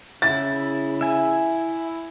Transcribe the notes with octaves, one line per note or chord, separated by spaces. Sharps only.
C#3 E4 A6
E5 G#5